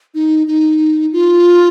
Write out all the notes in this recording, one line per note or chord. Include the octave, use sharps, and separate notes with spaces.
D#4
D#4
F4